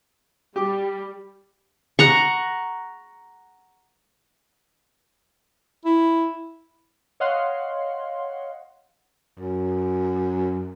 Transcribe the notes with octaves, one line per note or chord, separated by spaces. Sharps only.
G3 G4 D6
F#5 A#5 C#6
E4
C#5 D#5 F5 F#5 C6
F#2